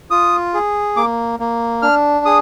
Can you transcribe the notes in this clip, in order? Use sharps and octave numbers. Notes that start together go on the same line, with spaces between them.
F4 D#6
G#4
A#3 D6
A#3
D4 F6
G#4 D#6